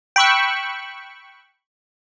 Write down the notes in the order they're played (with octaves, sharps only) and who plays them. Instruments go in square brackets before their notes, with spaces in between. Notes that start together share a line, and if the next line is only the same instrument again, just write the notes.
[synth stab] G5 B5 C#6 E6 F#6